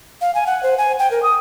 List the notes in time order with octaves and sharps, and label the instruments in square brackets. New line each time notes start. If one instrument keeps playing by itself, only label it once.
[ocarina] F5
G#5
F#5
C5
G#5
G5
A#4
D#6